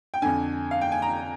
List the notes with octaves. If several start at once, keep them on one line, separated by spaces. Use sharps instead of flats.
G5
F2 D3 G#5
F5
G5
G#5
A#5